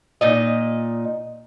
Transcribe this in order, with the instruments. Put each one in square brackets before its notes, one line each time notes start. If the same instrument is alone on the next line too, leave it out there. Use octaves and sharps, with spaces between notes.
[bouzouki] A#2 D#4 D#5